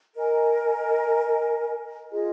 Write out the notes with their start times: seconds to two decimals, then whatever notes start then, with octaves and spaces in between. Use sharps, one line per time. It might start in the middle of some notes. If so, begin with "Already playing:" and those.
0.15 A#4 D#5 G#5
2.11 F4 G#4 D#5